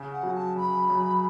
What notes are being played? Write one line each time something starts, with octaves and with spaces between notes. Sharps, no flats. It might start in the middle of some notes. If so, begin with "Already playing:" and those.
Already playing: C#3
F#5
F#3
A5
F#2 B5
F#2